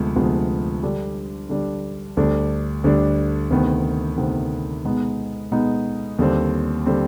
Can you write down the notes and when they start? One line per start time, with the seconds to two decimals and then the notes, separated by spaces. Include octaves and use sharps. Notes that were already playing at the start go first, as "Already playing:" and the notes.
Already playing: D2 C3 F3 G#3 B3
0.16 D2 C3 F3 G#3 B3
0.83 D3 G3 D4
1.49 D3 G3 D4
2.17 D2 D3 G3 D4
2.84 D2 D3 G3 D4
3.51 D2 C3 D#3 B3
4.18 D2 C3 D#3 B3
4.85 B2 G#3 B3 D#4
5.52 B2 G#3 B3 D#4
6.19 D#2 D3 G3 C4
6.86 D3 G3 C4